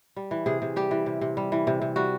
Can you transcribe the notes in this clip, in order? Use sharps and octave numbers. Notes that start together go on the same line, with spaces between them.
G3
E3
C3 G#4
C3
G3 G4
E3
C3
C3
G3
E3
C3
C3
G3 F#4